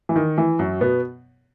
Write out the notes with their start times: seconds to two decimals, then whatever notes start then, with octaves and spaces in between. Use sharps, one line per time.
0.09 E3
0.16 D#3
0.38 E3
0.59 F#2 F#3
0.81 B2 B3